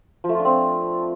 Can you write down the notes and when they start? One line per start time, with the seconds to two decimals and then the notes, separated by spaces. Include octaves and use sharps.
0.24 F3
0.29 A3
0.34 F4
0.40 D4
0.45 C4